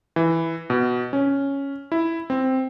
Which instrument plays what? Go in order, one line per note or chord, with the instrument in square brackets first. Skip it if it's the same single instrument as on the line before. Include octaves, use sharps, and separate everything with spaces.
[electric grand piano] E3
B2
C#4
E4
C4